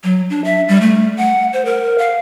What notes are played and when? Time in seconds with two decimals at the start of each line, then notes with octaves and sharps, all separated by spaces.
0.04 F#3
0.30 D4
0.44 E5
0.68 G3
0.81 A3
1.17 F#5
1.53 C5
1.65 A#4
1.98 F5